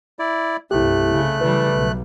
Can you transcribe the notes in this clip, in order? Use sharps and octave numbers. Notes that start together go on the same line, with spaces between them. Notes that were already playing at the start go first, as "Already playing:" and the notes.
E4 D5
C2 G2 A3 E4 G4 F#6
C#3
C#3 E3 G3 B4
B1